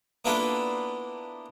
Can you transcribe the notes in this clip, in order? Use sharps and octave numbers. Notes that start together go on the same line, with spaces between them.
A#3 B3 D4 E4 F4 A4